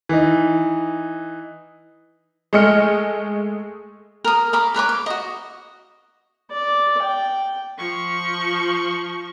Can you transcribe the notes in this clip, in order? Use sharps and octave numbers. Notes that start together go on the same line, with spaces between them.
E3 D#4
G#3 A3 D#5 F6 C#7
A#4 D#6
A#4 B5 D6
A#4 B4 C#5 D6
D6
F#4 D#5
D5
G5
F3 C#6